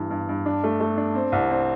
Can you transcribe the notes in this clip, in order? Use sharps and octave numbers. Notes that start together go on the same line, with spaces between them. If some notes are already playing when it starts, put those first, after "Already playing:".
Already playing: G2 E3
G2
G2
D4
A3
A3
D4
C4
C2
C4